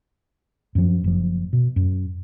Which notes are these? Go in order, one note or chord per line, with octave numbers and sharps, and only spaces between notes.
F#2 F3
F#1 F3
B2
F#2